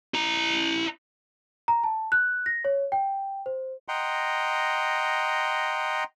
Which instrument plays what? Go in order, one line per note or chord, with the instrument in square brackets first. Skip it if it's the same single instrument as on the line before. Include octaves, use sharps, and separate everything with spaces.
[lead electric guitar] E4 A#5
[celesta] A#5
A5
F#6
A#6
C#5
G5
C5
[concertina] D#5 F#5 G5 A#5 C6